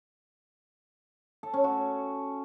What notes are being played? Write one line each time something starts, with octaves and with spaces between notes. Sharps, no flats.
A4
C#4
F#4